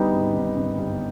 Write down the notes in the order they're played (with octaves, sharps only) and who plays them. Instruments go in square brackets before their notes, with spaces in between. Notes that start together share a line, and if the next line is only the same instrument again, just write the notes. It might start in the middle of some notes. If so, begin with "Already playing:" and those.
Already playing: [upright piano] D2 D3 [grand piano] G3 B3 D#4
[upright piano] G#1 G#2
G#1 G#2
G#1 G#2
G1 G2